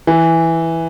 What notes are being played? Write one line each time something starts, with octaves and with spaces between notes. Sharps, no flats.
E3